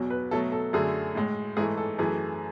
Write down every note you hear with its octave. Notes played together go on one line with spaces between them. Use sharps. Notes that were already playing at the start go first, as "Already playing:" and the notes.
Already playing: E2 B2 F#3
B4
B2 F#3 A3 A4
A4
F#2 D3 A3 G#4
A2 G#3
G#2 E3 A3 G#4
A4
F#2 E3 A3 G#4